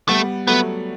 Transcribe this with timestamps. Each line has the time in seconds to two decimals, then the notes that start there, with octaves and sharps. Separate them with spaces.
0.08 G3 A3 B3
0.47 F#3 A3 B3